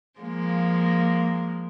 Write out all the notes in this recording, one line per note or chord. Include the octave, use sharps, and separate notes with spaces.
F3 G#3 A#3